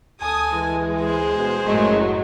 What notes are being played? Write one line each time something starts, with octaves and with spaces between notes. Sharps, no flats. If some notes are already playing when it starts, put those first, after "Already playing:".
D2 A4 G#5 D#6
E3 G#3
G#4 C5
B2
F#1 F#2 A2 F#3 G#3